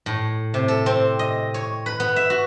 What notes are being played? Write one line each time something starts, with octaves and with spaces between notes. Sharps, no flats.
A2
C3
A4
C4
D#5
C#5
B4
B3
E5
F#4